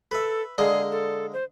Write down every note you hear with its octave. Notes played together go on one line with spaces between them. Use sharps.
A4 B4 E5
D3 G#3 A#3 G#4 D5
A4
C5